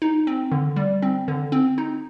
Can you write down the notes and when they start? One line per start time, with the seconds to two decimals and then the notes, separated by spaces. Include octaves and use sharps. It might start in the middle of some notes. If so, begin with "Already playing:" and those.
0.02 D#4
0.27 C4
0.52 D3
0.76 G3
1.02 C4
1.28 D3
1.52 C4
1.78 D#4